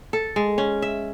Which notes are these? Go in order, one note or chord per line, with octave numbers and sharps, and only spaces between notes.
A4
G#3
C#4
E5